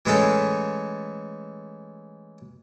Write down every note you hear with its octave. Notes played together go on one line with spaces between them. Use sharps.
E3 G#3 A3 C#4 A4